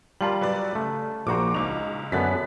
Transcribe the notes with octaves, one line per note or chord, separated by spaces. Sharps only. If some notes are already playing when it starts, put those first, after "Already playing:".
G3 F4 A#4 A5 F#7
F#3 B4 D5
C#3 A3
A#1 F#4 C5 A#5 C#6 D6
C#2 D#4 F7
F#2 D3 B3 F#6 A6 B6